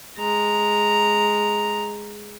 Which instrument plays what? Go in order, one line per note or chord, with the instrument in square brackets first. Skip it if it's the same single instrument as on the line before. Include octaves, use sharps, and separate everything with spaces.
[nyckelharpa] G#3 A#5